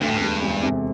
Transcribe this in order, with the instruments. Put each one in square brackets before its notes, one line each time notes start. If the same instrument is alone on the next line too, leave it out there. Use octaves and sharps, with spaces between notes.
[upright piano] D2 [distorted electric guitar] G2
[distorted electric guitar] A2
G2
[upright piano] E1
E1
C3